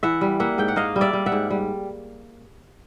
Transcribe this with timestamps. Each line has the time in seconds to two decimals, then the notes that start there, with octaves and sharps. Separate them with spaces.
0.03 E3 E5 F#5
0.21 G3
0.40 A#3 E5 F#5
0.58 G#2 G5
0.68 F#5
0.76 A#3 D#5 F5
0.96 G3
1.01 D5 E5
1.13 G3
1.26 E5 F#5
1.32 G#2
1.50 G3